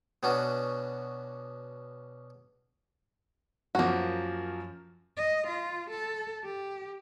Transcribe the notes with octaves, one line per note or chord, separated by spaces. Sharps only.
B2 B3 C#4 D4 F#4
F#2 F3 A#3 F#4
D#5
F4
A4
G4